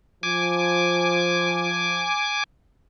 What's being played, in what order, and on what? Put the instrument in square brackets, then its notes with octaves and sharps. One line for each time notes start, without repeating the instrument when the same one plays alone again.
[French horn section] F3 [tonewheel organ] G#5 D6